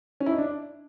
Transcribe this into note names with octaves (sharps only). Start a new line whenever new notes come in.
C#4
E4
D#4
D4